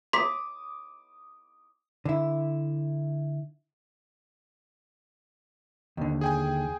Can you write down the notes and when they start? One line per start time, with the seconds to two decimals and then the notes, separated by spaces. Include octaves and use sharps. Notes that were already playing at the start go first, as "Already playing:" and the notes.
0.13 C6 D6 D#6 B6
2.05 D3 E4
5.97 D#2 D3
6.21 G#4 G5 G#5